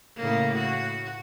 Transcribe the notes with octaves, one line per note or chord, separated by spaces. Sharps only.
A2 C#3 A#3
F#4